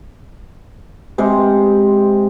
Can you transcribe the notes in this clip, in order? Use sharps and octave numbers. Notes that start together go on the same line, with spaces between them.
C3 G#3 C5